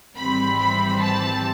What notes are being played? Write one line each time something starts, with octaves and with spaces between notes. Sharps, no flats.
G#1 G#2 E3 G3 C4 B5
B5
A5